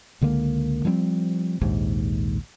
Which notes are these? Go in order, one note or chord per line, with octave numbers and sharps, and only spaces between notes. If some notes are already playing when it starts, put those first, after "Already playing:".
C#2 D3 G#3 A#3
F3 G3 A#3 C4
A#1 D#2 G#2